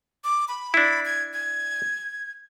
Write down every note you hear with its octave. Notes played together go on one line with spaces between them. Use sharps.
D6
B5
D4 E4
G#6
G#6